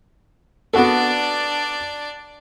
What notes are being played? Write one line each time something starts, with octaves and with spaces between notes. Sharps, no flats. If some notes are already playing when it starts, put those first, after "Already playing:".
B3 D4 F#4 A4 D5